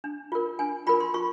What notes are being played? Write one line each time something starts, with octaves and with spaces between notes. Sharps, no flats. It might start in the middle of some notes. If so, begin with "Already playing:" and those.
D4
F4 A#4
D4 G#5
F4 A#4 B5
C6
F4 C#6